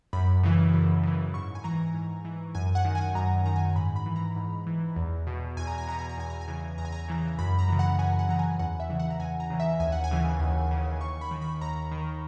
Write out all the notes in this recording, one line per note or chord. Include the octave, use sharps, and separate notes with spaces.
F#2 B5
C#3 E3
F#2
C#3 E3
G#2 C#6
G#5
E3 A#5
G#2
E3
F#2 G#5
F#5
D#3
G#5
F#2 A#5
D#3 A#5
G#5
G#2 B5
B5
E3
A#5
G#2
E3
E2
B2
E2 G#5
A#5
G#5
B2 A#5
G#5
A#5
E2 G#5
A#5
G#5
C#3 E3
E2 A#5
G#5
A#5
C#3 E3
F#2 B5
A#5
C#3 E3
F#5
F#2 G#5
F#5
C#3 E3 A#5
G#5
E2 F#5
E5
C#3 E3
F#5
A#5
E2 G#5
A#5
C#3 E3
E5
D#2 G#5
F#5
G#5
C#3 E3
D#2
C#3 E3
D#2 C#6
B5
D#3
B5
D#2 A#5
D#3